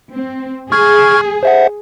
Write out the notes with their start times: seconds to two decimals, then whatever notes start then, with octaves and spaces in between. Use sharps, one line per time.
0.13 C4
0.72 G#4 C#6 F6 G#6
1.43 C5 E5 F#5